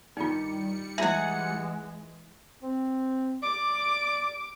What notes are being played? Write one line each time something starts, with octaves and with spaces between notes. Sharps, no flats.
G2 D#3 G3 D#4 F4 C#7
E3 G#3 E4 F4 G#4 E5 F#5
C4
D5 D6